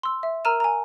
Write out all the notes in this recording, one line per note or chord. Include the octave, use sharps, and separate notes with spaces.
C6 E6
E5
A#4 A#5 E6 F6 D#7 E7
G#5 A#5